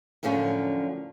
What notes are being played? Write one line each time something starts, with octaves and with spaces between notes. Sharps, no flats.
F#2 A2 D3 F3 C#4